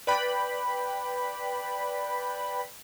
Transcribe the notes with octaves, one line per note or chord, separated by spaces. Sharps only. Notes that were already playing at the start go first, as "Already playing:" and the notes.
B4 D5 G5 B5